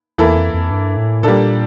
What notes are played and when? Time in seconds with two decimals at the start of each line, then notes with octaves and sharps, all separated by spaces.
0.18 E2 E3 A#3 E4 A4
0.36 F2
0.54 F2
0.71 G2
0.97 A2
1.23 A#2 G3 A#3 D4 A4